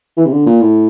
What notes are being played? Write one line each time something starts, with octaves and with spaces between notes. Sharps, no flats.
E3
C3
D3
A#2
A2